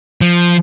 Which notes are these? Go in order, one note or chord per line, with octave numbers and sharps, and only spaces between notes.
F3